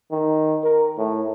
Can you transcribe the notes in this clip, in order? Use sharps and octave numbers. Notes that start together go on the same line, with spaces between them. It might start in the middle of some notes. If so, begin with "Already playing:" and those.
D#3
A#4
A2